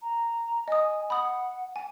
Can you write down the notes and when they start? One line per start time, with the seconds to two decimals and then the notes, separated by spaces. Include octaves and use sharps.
0.02 A#5
0.68 D#5 G#5 D#6
1.10 F#5 B5 D#6
1.76 G#5